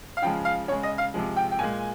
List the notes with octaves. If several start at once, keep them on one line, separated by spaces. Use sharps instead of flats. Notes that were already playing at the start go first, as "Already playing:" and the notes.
F5
C#3 F3 G#3 G5
F5
C#3 G#3 C#5
D#5
F5
C3 F3 G#3
G5
G5
A#2 G#3 G#5